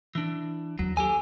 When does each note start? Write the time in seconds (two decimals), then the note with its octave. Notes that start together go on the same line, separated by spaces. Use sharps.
0.15 E3 D4
0.79 D#2 F#3
0.97 G4 A4 G#5